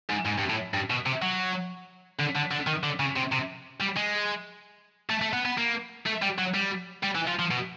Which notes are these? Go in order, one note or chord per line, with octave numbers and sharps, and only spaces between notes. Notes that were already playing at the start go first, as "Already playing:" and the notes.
G#2
G#2
G2
A2
G2
B2
C3
F#3
D3
D3
D3
D#3
D3
C#3
C3
C3
G3
G#3
A3
A3
B3
B3
A#3
A3
G3
F#3
G3
G3
E3
F3
F3
B2